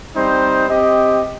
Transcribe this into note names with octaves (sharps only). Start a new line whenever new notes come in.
G3 C4 D#4 C5
C4 G4 D#5